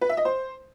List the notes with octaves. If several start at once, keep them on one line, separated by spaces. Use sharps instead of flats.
B4
E5
D#5
C5